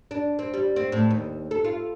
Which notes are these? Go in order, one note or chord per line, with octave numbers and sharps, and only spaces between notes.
D4
C4
G3
C4
A2
D#2
A4
F4